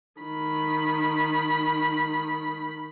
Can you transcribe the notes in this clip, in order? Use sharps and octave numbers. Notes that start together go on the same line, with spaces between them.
D#3 B5